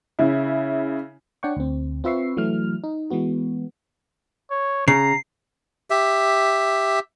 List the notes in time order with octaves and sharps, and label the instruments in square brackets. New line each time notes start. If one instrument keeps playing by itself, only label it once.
[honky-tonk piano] C#3 E4
[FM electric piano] D4 C#5 D5 F#5 G5 C#6
D2 C4
C4 F4 B4 E5 C#6 C7
E3 F#3 A3 E4 F6
D#4
E3 G#3 B3 F#4
[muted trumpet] C#5
[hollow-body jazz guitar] C#3 [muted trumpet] A#5 [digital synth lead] C7
[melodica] G4 E5